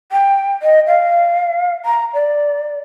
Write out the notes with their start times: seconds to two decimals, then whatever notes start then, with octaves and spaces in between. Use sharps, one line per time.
0.12 G5
0.62 D#5
0.87 F5
1.85 A#5
2.14 D5